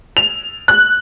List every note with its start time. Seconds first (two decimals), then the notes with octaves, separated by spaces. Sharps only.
0.17 F7
0.68 F#6